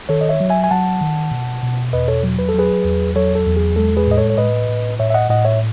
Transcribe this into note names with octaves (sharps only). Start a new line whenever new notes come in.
D#3 A4 C#5
D#5
C#5 E5
F#3
E5 G#5
G#5
F#3 F#5 A5
D#3
B2
B2
E2 B4 D#5
A4 C#5
F#3
B4
A4
F#3 G#4 B4
E2
F#3 A4 C#5
A4
E2
G#4
G#3 A4
G#4 B4
A2 D#5
A4 C#5
C#5
A2 B4 D#5
A2
A2 C#5 E5
E5
D#5 F#5
A2 D#5 F#5
C#5 E5